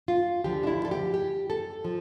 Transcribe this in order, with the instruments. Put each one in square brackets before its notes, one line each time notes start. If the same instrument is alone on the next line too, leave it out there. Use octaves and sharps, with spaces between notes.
[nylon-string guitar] F4
D2 D3 F3 G4
D4
E4
A4
G4
G4
A4
F3